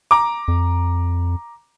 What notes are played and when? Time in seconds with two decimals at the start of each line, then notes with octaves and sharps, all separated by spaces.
0.11 A#5 D6
0.48 F2